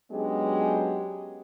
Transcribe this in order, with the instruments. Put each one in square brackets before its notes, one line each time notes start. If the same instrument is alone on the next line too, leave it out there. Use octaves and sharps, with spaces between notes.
[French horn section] F#3 G#3 B3 C#4 D4 G4